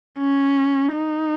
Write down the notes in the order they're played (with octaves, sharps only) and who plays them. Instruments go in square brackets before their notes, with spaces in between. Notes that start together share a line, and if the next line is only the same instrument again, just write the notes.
[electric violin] C#4
D#4